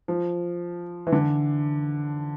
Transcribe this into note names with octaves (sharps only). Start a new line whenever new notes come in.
F3
E3
D3